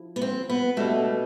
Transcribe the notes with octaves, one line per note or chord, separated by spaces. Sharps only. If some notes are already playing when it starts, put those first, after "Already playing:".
Already playing: F3 E4
B3
C4
B3
B2 G3 A3 D4